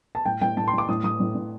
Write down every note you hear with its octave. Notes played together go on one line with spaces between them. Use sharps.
A5
A2 G5
A2 G5
A2 A5
C6
A2
D6
A2 D#6
A2 D#6
A2
A2